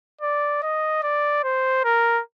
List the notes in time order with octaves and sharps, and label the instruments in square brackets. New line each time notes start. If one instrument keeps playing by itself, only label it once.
[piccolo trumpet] D5
D#5
D5
C5
A#4